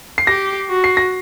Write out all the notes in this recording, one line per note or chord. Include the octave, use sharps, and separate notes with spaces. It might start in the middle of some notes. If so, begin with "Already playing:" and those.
C7
G4 A#6
F#4
C7
A#6